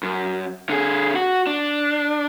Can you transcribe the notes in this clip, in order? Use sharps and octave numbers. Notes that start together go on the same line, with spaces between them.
F#2
D3 G#4
F#4
D4